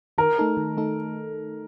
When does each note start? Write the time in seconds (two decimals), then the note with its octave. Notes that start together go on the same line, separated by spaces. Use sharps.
0.18 D#3 A#4
0.38 A3 D#4 A4
0.57 D#3
0.77 A3 D#4 A4